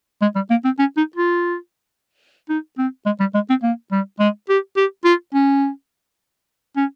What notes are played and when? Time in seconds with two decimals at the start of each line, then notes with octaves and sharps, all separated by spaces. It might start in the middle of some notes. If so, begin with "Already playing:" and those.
0.22 G#3
0.35 G3
0.50 A#3
0.65 C4
0.79 C#4
0.97 D#4
1.16 F4
2.49 D#4
2.78 C4
3.06 G#3
3.20 G3
3.34 G#3
3.50 C4
3.63 A#3
3.92 G3
4.20 G#3
4.49 G4
4.77 G4
5.05 F4
5.34 C#4
6.76 C#4